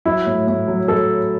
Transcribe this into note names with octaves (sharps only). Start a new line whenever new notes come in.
F#3 E4
A2
A2
F#3
F#3 A4